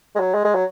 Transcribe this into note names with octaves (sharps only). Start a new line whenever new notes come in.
G#3
F#3
G#3
G#3
F#3